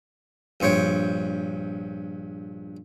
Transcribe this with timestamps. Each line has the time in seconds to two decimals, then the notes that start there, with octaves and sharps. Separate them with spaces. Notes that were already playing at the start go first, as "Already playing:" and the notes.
0.60 A#1 G2 C5 C#5 G5